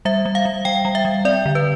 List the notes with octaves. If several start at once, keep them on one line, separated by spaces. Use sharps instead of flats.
G3 E5
G3
F5
G3
G3 G5
G3
E5
G3
C4 D5
D3
B4